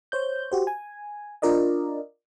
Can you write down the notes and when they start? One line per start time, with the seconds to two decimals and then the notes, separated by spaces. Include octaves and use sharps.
0.12 C5 C#5 G6
0.52 F#4 G4 C5
0.67 G#5
1.42 D4 F4 A#4 D5 D#5